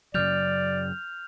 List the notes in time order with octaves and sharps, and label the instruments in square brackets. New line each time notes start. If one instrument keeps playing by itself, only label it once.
[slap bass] F#2 C#3 F#3 [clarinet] D5 [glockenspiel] F6 G6 F7